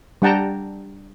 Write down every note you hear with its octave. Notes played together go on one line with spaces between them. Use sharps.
G3 D4 F#5 G5 A5 A#5